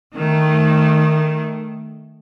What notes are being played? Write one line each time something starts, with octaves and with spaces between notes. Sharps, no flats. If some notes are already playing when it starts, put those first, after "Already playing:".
D#3 A3